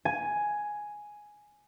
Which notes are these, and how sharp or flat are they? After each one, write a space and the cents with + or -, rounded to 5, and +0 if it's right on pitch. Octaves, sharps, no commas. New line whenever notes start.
G#5 +5